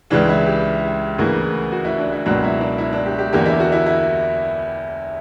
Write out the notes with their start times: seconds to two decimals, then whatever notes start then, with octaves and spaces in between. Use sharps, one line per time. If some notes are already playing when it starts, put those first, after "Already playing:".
0.10 C#2 C#3 E3 D4
0.29 E4
0.46 G4
1.18 D2 C#3 E3 A#3
1.72 F#4
1.85 E4
1.98 D4
2.12 E4
2.26 C#2 B2 F#3 A#3 D4
2.44 E4
2.61 D4
2.78 E4
2.93 D4
3.06 G4
3.18 G4
3.33 E2 D3 A#3 G4
3.46 E4
3.60 F#4
3.72 E4
3.86 E4